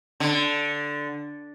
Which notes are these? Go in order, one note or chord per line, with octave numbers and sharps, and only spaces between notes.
D3